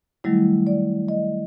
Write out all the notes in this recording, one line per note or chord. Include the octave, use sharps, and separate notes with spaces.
D#3 F#3 G3 A3 E4
D5
D#5